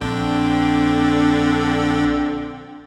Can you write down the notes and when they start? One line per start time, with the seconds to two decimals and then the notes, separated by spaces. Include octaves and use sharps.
0.01 A#1 D3 C4 D4 G5